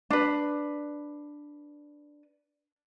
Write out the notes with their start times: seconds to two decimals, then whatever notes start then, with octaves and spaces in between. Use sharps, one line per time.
0.10 D4 B4